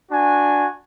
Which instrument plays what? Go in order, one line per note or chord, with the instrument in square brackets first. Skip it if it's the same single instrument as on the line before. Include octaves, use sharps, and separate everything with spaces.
[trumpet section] D4 F#4 G#5